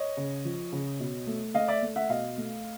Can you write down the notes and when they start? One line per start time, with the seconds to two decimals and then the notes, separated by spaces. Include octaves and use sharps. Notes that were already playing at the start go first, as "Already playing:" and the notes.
Already playing: C#5 D#5
0.17 C#3
0.45 F3
0.72 C#3
1.00 B2
1.27 A3
1.54 A3 D#5 F5
1.68 D5 E5
1.82 A3
1.96 E5 F#5
2.09 B2 D#5 F5
2.38 A3